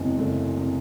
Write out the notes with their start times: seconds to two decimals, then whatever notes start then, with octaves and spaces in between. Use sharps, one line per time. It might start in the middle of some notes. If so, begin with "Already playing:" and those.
Already playing: F#1 E2 C3 G#3 C4
0.18 F#1 A3
0.57 C3